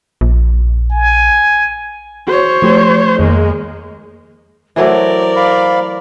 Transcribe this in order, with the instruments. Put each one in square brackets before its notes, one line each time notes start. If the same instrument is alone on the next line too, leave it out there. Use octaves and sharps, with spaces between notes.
[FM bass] A#1
[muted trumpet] G#5
[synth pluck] F#4 [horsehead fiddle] C5 C#5
[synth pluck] F3 A3 G4
[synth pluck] F2 D#3 [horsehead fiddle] G#3 A#3
[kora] E3 F#3 A3 [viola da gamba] A#4 D5 [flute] C5
[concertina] F5 B5